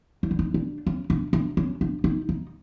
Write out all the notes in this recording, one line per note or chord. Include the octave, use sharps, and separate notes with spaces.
D#4
D4
D#4
D4
C#4
D4
D4
C#4
D4
D#4
D#4